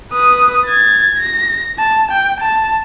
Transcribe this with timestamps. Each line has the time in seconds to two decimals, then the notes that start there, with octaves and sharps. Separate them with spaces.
0.13 B4 D#6
0.67 G#6 A6
1.18 A#6
1.79 A5
2.11 G5
2.41 A5